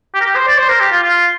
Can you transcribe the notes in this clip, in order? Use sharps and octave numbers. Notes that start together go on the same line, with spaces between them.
G4
A#4
G4
C5
D5
C5
A#4
G4
F4
F4